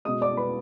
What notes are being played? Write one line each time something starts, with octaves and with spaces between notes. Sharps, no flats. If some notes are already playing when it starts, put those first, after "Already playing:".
B2 G#3 D#5 D#6
D5 D6
B4 B5